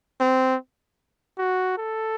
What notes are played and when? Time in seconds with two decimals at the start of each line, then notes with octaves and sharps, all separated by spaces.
0.20 C4
1.38 F#4
1.78 A4